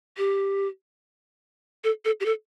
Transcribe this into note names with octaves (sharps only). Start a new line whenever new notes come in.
G4
A4
A4
G4
A4